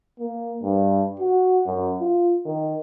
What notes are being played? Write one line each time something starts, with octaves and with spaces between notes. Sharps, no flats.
A#3
G2
F#4
F#2
F4
D#3